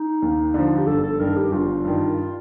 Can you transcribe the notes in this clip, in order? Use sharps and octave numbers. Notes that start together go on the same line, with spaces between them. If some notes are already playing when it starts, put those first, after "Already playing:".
Already playing: D#4
D#2
D3 F3
G4
G1 A4
A4
G2 D#3 A#4
G4
G1 F4
G2 D#3